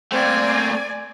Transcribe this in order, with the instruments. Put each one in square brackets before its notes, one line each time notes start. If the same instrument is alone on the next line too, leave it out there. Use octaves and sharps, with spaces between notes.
[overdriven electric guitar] A3 A#3 [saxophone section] C4 [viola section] D5 G#5